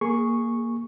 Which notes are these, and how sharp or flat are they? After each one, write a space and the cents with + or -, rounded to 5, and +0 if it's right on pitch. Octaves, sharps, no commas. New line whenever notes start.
A#3 +0 G#4 +0 C#6 -5